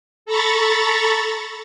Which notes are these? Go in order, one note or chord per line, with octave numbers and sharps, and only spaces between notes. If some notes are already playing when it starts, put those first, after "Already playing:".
A4 A#5 B5 C#6 A6